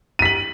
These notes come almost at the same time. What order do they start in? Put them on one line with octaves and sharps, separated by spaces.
D#7 B6 F#7